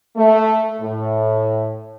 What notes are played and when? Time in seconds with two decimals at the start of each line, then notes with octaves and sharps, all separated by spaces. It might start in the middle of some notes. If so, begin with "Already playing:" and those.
0.17 A3
0.80 A2